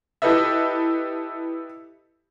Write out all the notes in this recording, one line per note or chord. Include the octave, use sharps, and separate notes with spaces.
E4 G4 A4 B4 D#5 E5